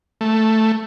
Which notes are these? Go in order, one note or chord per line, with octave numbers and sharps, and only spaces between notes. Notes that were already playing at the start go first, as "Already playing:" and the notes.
A3